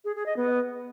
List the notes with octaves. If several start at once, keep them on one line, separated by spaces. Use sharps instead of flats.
G#4
G#4
D#5
B3